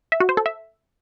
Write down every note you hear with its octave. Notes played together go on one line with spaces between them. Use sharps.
E5
F#4
C5
A4
E5